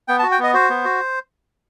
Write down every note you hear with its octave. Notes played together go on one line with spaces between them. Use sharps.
B3 G5
A5
F#4
G5
B3 D#5
F#4 C5
B3
F#4